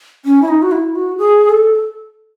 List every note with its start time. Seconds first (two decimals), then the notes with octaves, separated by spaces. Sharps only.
0.25 C#4
0.42 E4
0.48 D#4
0.62 F#4
0.72 E4
0.95 F#4
1.18 G#4
1.49 A4